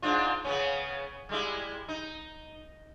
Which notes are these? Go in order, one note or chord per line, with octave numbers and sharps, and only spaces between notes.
G#2 D4 F4
C#3 B3 C#4
G3 G#3 E4
D#4